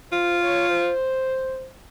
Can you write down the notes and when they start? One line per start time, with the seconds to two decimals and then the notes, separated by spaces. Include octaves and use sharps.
0.12 F4 C5
0.41 C#5
0.70 C5